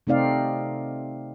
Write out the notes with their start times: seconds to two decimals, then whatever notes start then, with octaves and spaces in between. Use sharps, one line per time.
0.07 C3 A3 C4 D#4 D5 F5